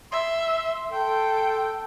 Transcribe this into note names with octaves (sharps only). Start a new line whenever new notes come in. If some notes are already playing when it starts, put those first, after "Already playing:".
E5 C6
A4 G5 C6